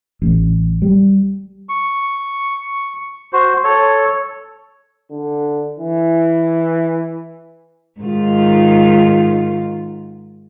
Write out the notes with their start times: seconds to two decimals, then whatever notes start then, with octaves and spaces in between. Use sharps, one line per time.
0.22 A1
0.82 G3
1.69 C#6
3.33 F#4 C5
3.64 A4 C#5
5.11 D3
5.79 E3
8.00 G#2 D#3 F4